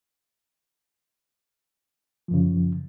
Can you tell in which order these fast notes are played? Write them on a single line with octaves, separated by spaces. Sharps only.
F3 F#2 C#3